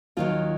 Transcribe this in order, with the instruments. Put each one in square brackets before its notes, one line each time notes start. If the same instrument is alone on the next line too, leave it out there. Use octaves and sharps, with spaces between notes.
[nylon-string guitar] D#2 D#3 F#3 F4